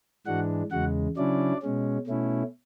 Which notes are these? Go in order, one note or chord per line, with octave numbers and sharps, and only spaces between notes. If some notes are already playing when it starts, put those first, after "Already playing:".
G#2 E3 G#3 D4 F#4 F#5
E2 C#3 G#3 F#4 F#5
C#3 F#3 C#4 D4 E4 D5
B2 G#3 C#4
B2 A3 C#4 E4